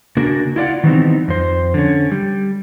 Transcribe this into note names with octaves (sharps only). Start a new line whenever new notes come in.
C#3 A#3 D4 F#4 A#4
E4 F4 D5 F#5
D#3 E3 G3 B3 C4 D#4
F2 C5
D3 C#4
G3